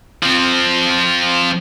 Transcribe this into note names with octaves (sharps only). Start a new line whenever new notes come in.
F3 C4